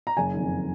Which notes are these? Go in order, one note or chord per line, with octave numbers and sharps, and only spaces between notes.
A#5
F#1 G#5
F2 D#3